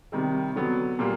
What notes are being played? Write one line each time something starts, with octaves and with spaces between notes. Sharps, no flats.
C3 D#3 G3
D3 F#3 B3
A#2 G3 A#3